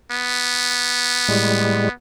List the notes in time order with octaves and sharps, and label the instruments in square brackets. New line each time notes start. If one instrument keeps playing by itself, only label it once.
[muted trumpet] B3
[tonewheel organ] A2 G3 G#3